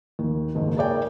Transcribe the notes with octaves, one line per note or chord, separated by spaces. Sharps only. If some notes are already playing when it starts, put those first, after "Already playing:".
D#2
F#1 D#2 G#2
G#4 A#4 C#5 D5 G5 G#5